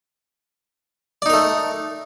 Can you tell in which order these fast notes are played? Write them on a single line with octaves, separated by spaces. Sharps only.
D5 D#4 A#4 A3